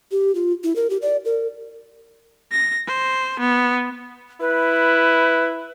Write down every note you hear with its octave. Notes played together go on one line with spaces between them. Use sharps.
G4
F4
E4
A#4
G4
D5
A#4
A#6
C5
B3
E4 B4